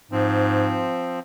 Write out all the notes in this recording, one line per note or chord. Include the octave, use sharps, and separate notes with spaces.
G#2 F3 C4